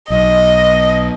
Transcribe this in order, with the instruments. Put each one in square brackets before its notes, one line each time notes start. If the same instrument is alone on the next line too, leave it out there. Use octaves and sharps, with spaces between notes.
[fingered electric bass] B1 [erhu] D#5